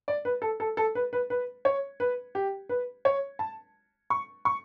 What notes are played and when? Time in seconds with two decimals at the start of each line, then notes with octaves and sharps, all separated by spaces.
0.08 D5
0.25 B4
0.42 A4
0.60 A4
0.77 A4
0.95 B4
1.13 B4
1.30 B4
1.65 C#5
2.00 B4
2.35 G4
2.69 B4
3.05 C#5
3.39 A5
4.10 C#6
4.45 C#6